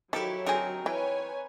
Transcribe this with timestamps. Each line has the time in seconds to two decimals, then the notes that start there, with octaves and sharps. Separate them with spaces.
0.13 D#3 F3 F#3 E4 G4 A4 C#5
0.46 D3 C4 D#4 G#4 A#4
0.86 E3 B4 C#5 G5 G#5